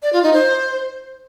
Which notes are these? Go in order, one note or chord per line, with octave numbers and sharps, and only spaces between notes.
D5
F4
D#4
C5